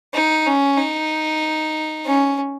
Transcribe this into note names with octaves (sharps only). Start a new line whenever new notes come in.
D#4
C#4
D#4
C#4